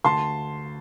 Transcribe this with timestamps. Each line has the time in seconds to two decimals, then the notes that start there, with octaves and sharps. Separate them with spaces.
0.04 D2 A5 C6